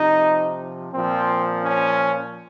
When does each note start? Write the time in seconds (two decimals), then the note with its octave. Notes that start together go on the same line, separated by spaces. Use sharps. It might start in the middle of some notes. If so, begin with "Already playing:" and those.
Already playing: C3 F3 D#4
0.92 A#2 F3 C4
1.63 C#4